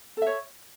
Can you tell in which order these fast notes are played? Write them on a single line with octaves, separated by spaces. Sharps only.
A4 E5 C#5